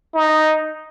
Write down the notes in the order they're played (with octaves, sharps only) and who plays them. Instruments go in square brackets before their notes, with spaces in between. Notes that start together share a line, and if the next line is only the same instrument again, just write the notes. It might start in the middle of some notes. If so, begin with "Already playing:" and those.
[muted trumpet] D#4